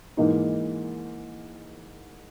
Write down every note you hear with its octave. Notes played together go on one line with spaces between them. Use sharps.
G#2 E3 A#3 D#4